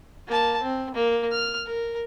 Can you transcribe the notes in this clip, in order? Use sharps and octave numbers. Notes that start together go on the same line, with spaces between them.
A#3 A5
C4
A#3
F6
A#4